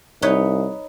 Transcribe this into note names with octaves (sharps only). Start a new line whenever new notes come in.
C2 D#4 B4 C#5